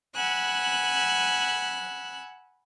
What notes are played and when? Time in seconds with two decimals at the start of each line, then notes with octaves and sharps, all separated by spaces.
0.15 F#5 G#5 B5 E6 F#6